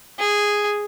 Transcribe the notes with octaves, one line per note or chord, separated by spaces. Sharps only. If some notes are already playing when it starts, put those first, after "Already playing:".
G#4